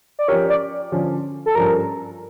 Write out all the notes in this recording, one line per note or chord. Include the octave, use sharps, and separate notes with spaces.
D5
F3 C#4 G4 A#4 C#5
D5
D3 F3 C#4
A4
G2 F3 C#4 A#4